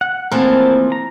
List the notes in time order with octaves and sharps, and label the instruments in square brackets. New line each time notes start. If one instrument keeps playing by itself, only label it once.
[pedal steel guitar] F#5
[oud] E3 F3 [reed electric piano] A3 A#3 C4 [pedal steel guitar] A#4 A5
[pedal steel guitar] A#5